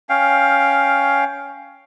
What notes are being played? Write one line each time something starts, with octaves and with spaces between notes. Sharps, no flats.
C#4 F5 G5